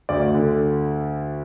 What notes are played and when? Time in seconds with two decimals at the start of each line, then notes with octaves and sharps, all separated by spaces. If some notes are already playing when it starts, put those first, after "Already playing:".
0.09 D2 D5
0.34 D3